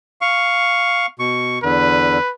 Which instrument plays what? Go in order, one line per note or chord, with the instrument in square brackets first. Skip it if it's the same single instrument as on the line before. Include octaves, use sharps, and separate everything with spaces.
[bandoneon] F5 C#6
B2 C#6
[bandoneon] E2 D3 [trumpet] B4